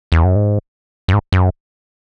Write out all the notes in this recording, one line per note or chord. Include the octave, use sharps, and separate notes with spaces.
E2
F#2
G#2
F#2
G#2
F#2